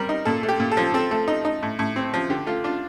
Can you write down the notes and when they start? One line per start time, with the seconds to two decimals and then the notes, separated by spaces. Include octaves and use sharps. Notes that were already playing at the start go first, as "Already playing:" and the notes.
Already playing: G3 C4 A#4
0.09 D#4
0.25 A#2 A4
0.43 A3
0.49 G4
0.60 A#2
0.72 A4
0.77 F3
0.94 C4 A4
1.11 A3
1.28 D#4
1.45 D#4
1.63 A2
1.79 A2
1.96 C4
2.14 F3
2.30 D3 G4
2.47 A3 F4
2.64 D4 F4